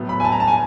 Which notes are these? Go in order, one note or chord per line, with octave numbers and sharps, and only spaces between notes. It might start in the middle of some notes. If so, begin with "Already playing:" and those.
Already playing: A2 F#3 B3
B5
G#5
A5
A#5
A5
G#5